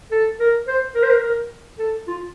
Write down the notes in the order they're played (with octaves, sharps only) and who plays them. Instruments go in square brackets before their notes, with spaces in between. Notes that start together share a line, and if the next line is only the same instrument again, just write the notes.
[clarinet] A4
A#4
C5
A#4
C5
A#4
A#4
A4
F4